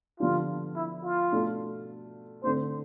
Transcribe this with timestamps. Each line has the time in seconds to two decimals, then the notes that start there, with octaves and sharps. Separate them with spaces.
0.20 D3 F3 B3 D4 F4 G4
0.76 E4
1.04 F4
1.32 B2 A3 D4
2.44 D3 A3 C4 C5